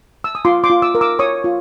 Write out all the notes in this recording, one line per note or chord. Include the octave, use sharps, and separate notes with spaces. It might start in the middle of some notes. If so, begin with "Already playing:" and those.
E6
D#6
F4 C6 D6
C6 D6
F4
D6 E6
A#4
D6 E6
C#5 C#6 D#6
F4